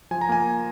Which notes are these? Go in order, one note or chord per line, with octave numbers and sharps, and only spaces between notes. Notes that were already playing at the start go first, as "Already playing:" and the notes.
F3 G#5
A#5
A#3 G#5